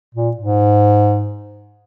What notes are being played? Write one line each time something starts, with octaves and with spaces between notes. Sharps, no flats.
A#2
G#2